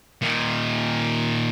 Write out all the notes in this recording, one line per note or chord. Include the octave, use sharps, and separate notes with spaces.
A#2 D#3